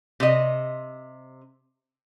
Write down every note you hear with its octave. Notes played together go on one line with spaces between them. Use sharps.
C3 D#5